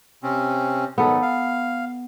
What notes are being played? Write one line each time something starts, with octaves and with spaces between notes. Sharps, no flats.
C3 C4 C#4
G#2 D#3 F#3 B3 A4
F5